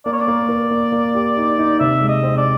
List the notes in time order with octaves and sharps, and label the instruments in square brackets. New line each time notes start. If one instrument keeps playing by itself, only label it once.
[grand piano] A#3 [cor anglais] D5
[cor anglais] C#5
D5
[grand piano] A#3
A#4
A#3
A#3
G4
D#4
D#4
[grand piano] C3 [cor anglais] E5
[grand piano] G#3
[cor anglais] D#5
[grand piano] C4
[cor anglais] D5